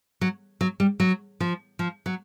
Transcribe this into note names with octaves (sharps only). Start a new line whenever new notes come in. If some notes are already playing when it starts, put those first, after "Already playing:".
F#3
F#3
G3
F#3
F3
F3
F#3